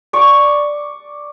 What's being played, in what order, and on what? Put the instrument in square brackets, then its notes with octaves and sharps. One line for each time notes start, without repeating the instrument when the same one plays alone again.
[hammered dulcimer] D5 C#6 D6